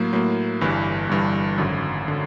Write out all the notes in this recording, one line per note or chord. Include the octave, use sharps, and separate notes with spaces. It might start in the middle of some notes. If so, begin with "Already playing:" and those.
Already playing: A2 F#3 A#3
A2 F#3 A#3
G1 G2 E3
G1 G2 E3
G#1 F#2 D3
D3